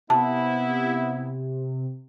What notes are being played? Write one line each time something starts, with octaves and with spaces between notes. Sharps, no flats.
C3 B3 E4 A5